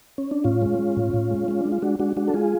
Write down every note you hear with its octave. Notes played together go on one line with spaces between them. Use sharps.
C#4
D4
A2 C#4 F4
G#3
G#3
A2
A2
G#3
G#3 C#4
G#3 D4
F4
G#3 D4 F#4
G#3 D4 F#4
G#3 D4 F#4
A4
G#3 F4 G#4